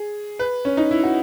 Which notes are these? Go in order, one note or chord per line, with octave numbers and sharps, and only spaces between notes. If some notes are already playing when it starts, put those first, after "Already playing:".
Already playing: G#4
B4
C#4
D#4
E4
F#4